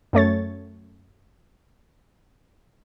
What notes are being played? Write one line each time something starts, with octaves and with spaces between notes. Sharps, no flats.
F#2 A3 C#5 A6